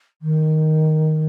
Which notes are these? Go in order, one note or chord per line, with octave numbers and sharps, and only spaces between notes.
D#3